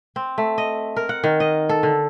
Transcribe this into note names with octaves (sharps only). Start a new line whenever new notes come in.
C4
A3
D#5
A#4
F#5
D#3
D#5
A4
D3